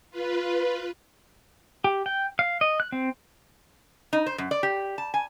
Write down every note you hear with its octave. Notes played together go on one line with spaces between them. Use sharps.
F4 B4
G4
G5
F5
D#5
F#6
C4
D#4
C5
F#2
D5
G4
A5
G#5